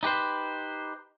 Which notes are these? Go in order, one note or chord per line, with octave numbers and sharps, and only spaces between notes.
D#4 G4 B4 C5